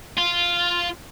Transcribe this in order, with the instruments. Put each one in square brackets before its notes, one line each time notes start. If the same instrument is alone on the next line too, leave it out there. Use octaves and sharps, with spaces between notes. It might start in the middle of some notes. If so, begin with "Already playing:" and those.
[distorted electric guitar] F4